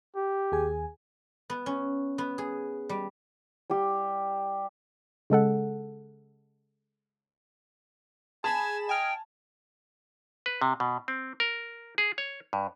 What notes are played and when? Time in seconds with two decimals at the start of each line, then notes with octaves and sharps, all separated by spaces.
0.16 G4
0.52 D#2 G#4 G#5
1.50 B3
1.66 C#4
2.18 B3
2.38 G#4
2.89 G3
3.70 G3 G4
5.30 C#3 G#3 A4 F#5
8.44 G#4 G#5 A5 B5 E7
8.89 D#5 G5 G#5 F6
10.46 B4
10.62 C3
10.80 B2
11.08 C4
11.40 A#4
11.98 G#4
12.18 C#5
12.53 G2